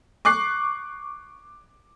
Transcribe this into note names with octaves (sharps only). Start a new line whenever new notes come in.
C#6 D6 F#6 C7